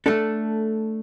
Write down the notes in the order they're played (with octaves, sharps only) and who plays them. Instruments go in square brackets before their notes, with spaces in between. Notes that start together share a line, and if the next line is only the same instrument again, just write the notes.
[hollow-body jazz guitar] A3 D4 A4